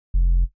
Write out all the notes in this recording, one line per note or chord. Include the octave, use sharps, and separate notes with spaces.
F1